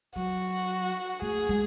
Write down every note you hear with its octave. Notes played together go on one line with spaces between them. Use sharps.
F#3 F#4
A3 G#4
G#3